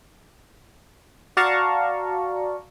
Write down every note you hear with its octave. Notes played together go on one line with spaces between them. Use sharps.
F#4 D5 F5 A5 A#5 C#6